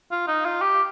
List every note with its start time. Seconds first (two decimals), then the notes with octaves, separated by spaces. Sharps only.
0.11 F4
0.28 D#4
0.45 F4
0.61 G4